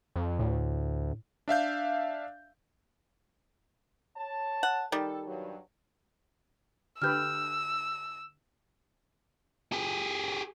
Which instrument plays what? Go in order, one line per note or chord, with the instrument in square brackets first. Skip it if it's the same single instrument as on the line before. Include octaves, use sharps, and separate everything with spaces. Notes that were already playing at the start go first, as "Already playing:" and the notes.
[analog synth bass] F2
[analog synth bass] D2 [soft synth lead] A2
[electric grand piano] D4 E5 F5 G6
[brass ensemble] C#5 A5
[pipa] F#5
[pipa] D#3 G3 [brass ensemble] A4
[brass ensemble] G2 F#3
[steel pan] D3 G4 B4 [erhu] E6 [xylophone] F6 G6
[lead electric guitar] G4 G#4